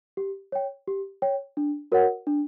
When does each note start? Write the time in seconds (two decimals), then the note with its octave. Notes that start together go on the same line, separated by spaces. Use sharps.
0.17 G4
0.52 C#5 G5
0.88 G4
1.22 C#5 G5
1.57 D4
1.92 F#4 A#4 C#5 F#5
2.27 D4